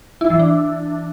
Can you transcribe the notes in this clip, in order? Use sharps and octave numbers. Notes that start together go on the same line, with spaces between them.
E4
E3
D4